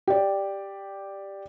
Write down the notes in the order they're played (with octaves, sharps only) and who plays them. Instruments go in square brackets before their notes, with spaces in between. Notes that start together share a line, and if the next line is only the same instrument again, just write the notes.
[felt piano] G4 D5